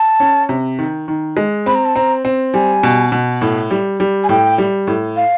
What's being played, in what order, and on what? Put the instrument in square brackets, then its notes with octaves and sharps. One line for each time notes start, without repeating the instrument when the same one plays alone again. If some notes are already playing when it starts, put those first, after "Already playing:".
Already playing: [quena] A5
[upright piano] C#4
C3
D#3
D#3
G#3
[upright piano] C4 [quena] B5
[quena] A#5
A5
[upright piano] C4 [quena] A#5
[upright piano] C4
[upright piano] G3 [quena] G#5
[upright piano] B2
B2
A2
G3
G3
[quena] G#5
[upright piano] A2 [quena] G5
[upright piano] G3
A2
[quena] F5